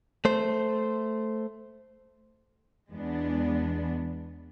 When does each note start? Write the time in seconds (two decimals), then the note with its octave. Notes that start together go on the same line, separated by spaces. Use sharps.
0.25 A3 C5
2.91 E2 G#3 B3 D4